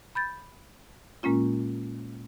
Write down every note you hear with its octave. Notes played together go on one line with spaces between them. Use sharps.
B5 G6 A6
A#2 G#3 A#3 C#4 F4